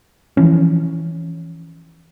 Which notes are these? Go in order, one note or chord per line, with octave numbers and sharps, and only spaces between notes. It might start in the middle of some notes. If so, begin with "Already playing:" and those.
E3 F3 C#4